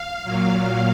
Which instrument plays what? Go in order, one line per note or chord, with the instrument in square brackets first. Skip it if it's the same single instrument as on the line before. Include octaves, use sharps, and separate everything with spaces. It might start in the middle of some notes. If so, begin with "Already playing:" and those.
Already playing: [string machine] F5
A#2 F#3 F5